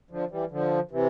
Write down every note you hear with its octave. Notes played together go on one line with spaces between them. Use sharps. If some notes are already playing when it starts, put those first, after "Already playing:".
D3 F3
E3 G3
D3 F3
C3 E3